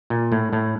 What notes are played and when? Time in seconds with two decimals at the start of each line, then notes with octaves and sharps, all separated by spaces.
0.10 A#2
0.32 A2
0.53 A2